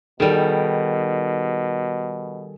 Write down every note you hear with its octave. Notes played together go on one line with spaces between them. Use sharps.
B2 D#3 G3 G#4 A4 D7